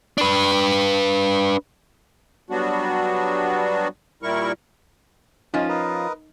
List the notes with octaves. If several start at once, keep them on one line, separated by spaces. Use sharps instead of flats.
D4 B4
F#3 G3 B3 D4 F#4
A#2 G3 E4 A#4 C#6
F3 C#4 D#4 F4 G#5
A#4 B4 D#5